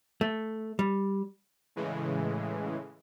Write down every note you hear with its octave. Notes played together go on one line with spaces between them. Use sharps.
A3
G3
A2 C#3 E3 G#3